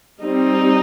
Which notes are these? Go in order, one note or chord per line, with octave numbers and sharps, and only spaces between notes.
G3 C4 D#4